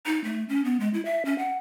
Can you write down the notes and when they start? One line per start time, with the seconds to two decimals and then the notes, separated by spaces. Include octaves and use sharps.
0.06 D#4
0.24 A3
0.49 C#4
0.65 B3
0.80 G#3
0.94 E4
1.05 E5
1.25 C#4
1.39 F#5